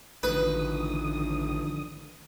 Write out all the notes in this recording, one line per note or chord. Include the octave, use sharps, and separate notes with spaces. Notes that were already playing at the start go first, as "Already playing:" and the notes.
A1 D3 D#3 F3 B4 D#6